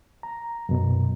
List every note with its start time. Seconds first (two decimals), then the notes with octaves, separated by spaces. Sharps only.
0.23 A#5
0.69 F#2 B2